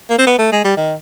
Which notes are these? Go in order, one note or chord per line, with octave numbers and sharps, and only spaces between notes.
A#3
C4
B3
A3
G#3
G3
D#3